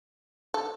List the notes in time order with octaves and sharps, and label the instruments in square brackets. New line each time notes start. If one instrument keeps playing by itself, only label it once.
[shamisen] A4